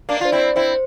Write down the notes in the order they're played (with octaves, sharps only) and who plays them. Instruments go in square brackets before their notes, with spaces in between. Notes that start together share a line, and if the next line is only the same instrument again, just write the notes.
[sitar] A#3 D4
[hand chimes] D5
[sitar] F4 [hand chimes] C5
[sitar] C4 E4
[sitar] C4 E4 [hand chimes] C5